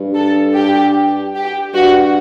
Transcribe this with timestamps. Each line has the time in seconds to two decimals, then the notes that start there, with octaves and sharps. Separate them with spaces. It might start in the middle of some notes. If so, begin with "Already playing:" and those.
Already playing: G2
0.15 A4
0.55 G4
1.35 G4
1.74 G2 F#4